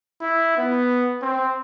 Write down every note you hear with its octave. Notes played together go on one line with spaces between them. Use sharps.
E4
B3
C4